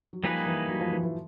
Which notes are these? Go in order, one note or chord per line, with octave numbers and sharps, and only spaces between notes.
F#3
F3 G3 A#3 D#4 G#4 B4
E3
F#3
F3
E3
E3